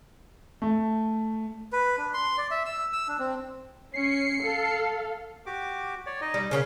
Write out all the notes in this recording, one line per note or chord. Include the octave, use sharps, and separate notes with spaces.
A3
B4
D4
C6
D5
E5
E6
E6
D4
C4
C#4 C7 C#7
A4 F5
F#4 G4 D6
C#5 D5
D#4 D#5
G3
C#3 C#4 A#4 F5